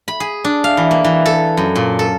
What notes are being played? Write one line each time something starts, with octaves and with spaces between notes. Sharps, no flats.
B5
G#4
D4
F5
E3
A#3
E3
A4
F#2
A#2
A4